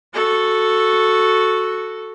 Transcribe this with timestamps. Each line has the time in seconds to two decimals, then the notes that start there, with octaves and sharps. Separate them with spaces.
0.14 F#4 A4